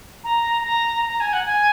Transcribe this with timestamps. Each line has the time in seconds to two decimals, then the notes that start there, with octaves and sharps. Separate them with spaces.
0.24 A#5
0.65 A#5
1.06 A#5
1.20 G#5
1.33 F#5
1.45 G#5